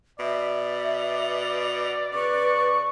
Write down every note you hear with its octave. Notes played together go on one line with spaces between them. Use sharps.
B2 D5 E5
C#3 B4 C#6